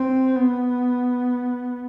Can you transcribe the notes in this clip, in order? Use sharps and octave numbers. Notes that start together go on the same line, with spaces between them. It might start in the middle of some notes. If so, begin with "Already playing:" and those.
Already playing: C4
B3